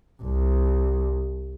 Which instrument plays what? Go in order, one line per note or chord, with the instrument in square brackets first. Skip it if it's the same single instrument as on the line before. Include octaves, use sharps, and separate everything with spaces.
[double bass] C2